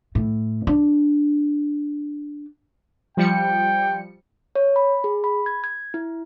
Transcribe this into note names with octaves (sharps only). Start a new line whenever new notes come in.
A2
D4
F3 G3 G5 C#7
C#5
B5
G#4
B5
G#6
G#6
E4